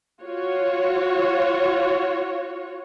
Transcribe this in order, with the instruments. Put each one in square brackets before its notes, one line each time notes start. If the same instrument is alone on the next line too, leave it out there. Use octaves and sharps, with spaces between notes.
[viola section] F4 F#4 C#5